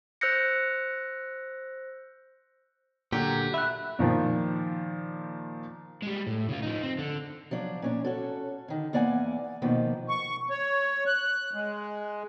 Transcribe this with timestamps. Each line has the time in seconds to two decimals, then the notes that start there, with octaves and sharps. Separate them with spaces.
0.21 C5 E6 F#6 G6 A#6 C#7
3.12 A#2 D3 F#3 G4
3.54 A3 E5 B5 F#6
3.99 A#2 D#3 F3
6.03 G3 G#3
6.27 A2
6.49 C#3 F4
6.62 F3 D#4
6.83 C4
6.98 D3
7.51 F3 F#3 D4
7.82 A#2 C#4 D4
8.04 C#4 F#4 A4
8.68 D3 D#3
8.93 E2 A#3 D5 F#5 G#5
9.62 B2 D#3 F3 A#3
10.09 C#6
10.50 C#5
11.07 F#6
11.54 G#3